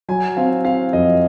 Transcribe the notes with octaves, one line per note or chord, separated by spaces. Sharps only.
F#3 G#5
C4 F5
C4 F5
F2 D#5